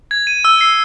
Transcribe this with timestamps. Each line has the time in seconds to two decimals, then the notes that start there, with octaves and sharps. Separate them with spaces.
0.11 G#6
0.27 D#7
0.45 E6
0.61 C7